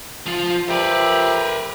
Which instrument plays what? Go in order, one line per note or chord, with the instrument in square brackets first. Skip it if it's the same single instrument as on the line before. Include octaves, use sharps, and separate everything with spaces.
[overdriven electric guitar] F3 F4
[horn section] F3 G4 E5 [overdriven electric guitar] A#4 B4